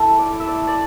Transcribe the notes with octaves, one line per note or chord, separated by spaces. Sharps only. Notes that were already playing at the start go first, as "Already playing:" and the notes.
Already playing: E4 A4
A3
D5
E4
E5
D5
A3
D5